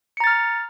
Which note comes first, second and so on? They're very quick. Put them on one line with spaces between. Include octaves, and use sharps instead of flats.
C#7 A#5 A6 F6